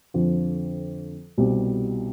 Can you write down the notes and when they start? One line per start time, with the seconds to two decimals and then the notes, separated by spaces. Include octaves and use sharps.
0.14 F2 D3 F3
1.38 C2 B2 G3